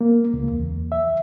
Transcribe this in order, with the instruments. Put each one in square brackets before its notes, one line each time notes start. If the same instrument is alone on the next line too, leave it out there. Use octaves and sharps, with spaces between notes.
[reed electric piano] A#3
C#2
E2
E5